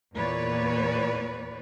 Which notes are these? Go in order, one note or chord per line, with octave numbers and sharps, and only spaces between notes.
E2 A#2 B4 C#5 D5